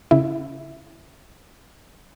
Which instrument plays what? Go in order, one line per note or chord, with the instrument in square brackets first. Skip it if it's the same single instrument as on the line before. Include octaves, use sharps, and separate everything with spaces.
[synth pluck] C#3 E4